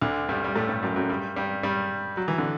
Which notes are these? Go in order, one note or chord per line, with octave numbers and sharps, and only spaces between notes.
D2 D3
G2 G3
G3
A2 A3
G2 G3
F#2 F#3
F#2 F#3
G2 G3
G2 G3
G2 G3
F#3
E3
D3